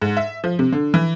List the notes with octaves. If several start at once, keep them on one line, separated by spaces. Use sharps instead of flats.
G#2
E5
F3
C3
D3
E3